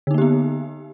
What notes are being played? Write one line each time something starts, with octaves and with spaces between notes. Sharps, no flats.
D3 A#3 B3 D#4 G4